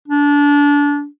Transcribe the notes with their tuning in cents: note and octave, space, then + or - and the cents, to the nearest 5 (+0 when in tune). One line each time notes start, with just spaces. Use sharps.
D4 -25